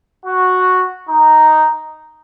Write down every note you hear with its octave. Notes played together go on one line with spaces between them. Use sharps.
F#4
D#4